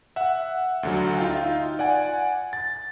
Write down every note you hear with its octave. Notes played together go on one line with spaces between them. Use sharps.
E5 F#5
D2 D3 F#3
D#4 F4 E5 F5 G5
D5 F#5 G#5
A6